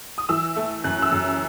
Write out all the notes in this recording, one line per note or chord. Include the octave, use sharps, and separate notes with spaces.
D#6
E3 E6
A3
F#2 F#6
E6
F#2